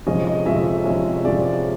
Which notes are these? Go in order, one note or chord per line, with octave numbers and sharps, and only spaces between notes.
F2 C3 F3 G#3 C#4 D#5
D#5
F2 C3 F3 G#3 C#4 E5
F2 C3 F3 G#3 C#4
F2 C3 F3 G#3 C#4 D5